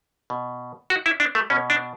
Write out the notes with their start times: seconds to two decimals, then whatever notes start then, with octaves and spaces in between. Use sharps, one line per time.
0.30 B2
0.90 F#4
1.06 E4
1.20 D4
1.35 A3
1.50 B2 C#4
1.70 D4